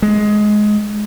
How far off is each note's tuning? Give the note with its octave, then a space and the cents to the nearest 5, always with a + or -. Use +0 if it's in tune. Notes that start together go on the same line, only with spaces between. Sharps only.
G#3 +15